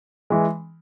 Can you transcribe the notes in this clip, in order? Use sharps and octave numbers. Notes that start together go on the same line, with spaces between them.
E3 G#3